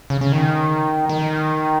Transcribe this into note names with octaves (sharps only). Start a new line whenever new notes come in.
C#3
C#3
D#3
D#3